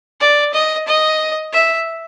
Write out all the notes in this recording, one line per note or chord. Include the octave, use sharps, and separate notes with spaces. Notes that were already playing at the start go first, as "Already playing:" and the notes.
D5
D#5
D#5
E5